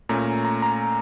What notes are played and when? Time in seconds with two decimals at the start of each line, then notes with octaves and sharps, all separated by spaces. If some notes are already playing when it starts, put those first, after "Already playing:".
0.09 A#2 A3 C#4 A#5
0.45 A#5
0.62 A#5